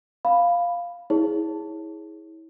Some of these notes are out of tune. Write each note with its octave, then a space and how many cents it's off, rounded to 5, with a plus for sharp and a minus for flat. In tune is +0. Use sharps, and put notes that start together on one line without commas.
F5 +0 B5 +0
E4 -30 G#4 +0 C#5 +0